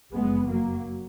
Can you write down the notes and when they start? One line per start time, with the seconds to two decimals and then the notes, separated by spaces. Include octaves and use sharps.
0.13 F#1 F2 G#3 B3
0.49 F#3 A#3